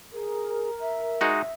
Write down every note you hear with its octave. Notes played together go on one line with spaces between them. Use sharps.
G#4 A#4
E5
G#3 D#4 F#4